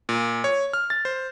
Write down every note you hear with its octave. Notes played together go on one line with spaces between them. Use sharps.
A#2
C#5
F6
A6
C5